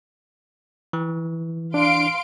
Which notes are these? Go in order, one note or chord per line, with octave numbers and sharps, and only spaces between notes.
E3
D4 F5 C6 D7